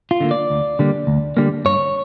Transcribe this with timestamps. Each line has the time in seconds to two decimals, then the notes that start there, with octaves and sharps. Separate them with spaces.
0.11 F4
0.20 D3 G3 A#3
0.31 D5
0.50 D2
0.79 D3 G3 A#3
1.07 D2
1.37 D3 G3 A#3
1.65 G2 C#5